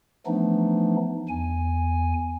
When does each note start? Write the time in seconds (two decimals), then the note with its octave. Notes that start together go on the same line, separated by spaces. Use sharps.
0.26 E3 F3 A3 B3 D4 D#4
1.29 E2 G#5